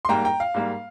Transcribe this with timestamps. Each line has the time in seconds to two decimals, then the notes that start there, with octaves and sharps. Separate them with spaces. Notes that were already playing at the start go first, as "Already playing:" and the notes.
0.05 C6
0.09 G#2 G3 A#3 G5 A#5
0.25 G5 A#5
0.40 F5
0.54 G#2 G3 A#3